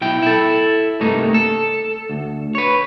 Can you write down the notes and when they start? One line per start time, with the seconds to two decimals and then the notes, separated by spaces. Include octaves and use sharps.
0.01 B1 E4 G5
0.22 E4 A4
1.00 C2 G2 A3 A#3 D#4
1.34 A4
2.10 D2
2.55 B4 C#5